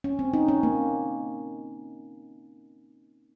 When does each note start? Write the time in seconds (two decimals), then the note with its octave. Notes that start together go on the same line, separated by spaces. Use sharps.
0.04 C#4
0.19 C4
0.33 D#4
0.48 C#4
0.63 A#3